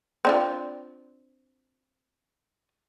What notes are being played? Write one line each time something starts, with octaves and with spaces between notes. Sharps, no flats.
C4 D4 F4